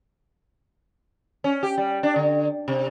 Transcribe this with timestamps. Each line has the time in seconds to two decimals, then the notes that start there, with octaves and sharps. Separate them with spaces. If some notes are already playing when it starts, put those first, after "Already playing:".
1.44 C#4
1.63 G4
1.78 G3
2.03 D4
2.16 D3
2.68 C3